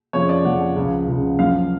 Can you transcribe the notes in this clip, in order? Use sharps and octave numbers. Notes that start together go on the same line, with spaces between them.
F2 C#3 F3 C#5
D5
F2 C#3 F3 F#5
C#2 C#3 F3
C#2 C#3 F3
F#2 F3 F5